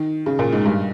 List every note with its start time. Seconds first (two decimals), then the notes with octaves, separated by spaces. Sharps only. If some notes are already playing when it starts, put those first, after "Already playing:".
Already playing: D#3
0.26 C#3
0.39 A#2
0.53 G#2
0.66 G2